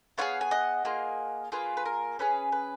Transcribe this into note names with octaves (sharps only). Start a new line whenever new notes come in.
B3 F4 G#4 C#5 F5
G#5
D#5 F#5
A#3 F4 G#4
A#3 F4 G#4 B4
B4
A#4
C#4 G#4 B4
B4